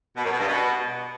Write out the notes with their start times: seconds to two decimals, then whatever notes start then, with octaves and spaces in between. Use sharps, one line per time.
0.17 B2
0.24 F#2
0.32 B2
0.40 G2
0.48 B2